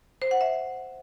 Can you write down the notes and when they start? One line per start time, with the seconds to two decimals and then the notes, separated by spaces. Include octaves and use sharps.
0.22 C5
0.31 F#5
0.41 E5